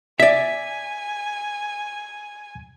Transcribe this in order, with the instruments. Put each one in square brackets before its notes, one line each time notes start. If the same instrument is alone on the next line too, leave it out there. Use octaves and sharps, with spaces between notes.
[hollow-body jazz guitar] D5 E5 [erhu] G#5 [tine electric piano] B6